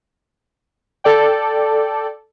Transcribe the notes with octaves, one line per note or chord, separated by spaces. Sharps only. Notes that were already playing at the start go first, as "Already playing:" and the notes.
A4 D5 G5